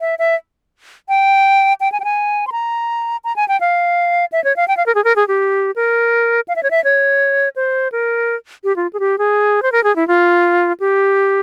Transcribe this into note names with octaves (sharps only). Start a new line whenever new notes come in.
E5
E5
G5
G5
G#5
G5
G#5
C6
A#5
A#5
G#5
G5
F5
E5
C#5
F5
G5
F5
A#4
G#4
A#4
G#4
G4
A#4
F5
E5
C#5
E5
C#5
C5
A#4
G4
F4
G#4
G4
G#4
C5
A#4
G#4
E4
F4
G4